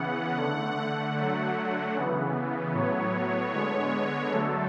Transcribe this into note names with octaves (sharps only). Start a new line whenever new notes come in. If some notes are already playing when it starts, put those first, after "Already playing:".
Already playing: C#3 E3 B3 F#5
D3 A3
D3 F#3 A3
C#3 E3 B3
A2 F#3 B3 C#5
D3 G#3 B3 C#5
D3 F#3 A3 A4